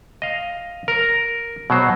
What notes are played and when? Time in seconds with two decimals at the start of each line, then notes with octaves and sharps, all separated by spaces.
0.22 D#5 F5
0.88 A#4 A#5
1.70 B2 F#3 C5